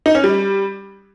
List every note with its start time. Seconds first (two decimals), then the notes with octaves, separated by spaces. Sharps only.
0.06 D#4
0.15 C#4
0.24 G3